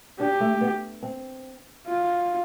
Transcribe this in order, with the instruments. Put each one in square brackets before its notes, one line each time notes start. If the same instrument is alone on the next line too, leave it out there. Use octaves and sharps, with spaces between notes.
[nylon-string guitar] D4 [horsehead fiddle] G4
[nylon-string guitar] A3
B3
C4
[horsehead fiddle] F4